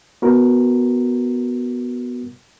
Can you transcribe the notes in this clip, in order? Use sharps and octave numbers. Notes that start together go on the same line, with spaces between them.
B3 F#4 A#4